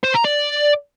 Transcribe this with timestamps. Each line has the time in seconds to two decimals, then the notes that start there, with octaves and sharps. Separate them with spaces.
0.04 C5
0.14 A#5
0.24 D5